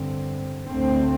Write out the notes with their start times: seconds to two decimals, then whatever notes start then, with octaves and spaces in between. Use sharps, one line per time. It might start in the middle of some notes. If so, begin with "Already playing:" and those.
Already playing: G2 D3 C4
0.67 D2 D3 A3 C4